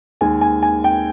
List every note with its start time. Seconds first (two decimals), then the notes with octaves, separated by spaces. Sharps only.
0.21 D#2 D#3 G#3 G#5
0.41 G#5
0.63 G#5
0.84 G5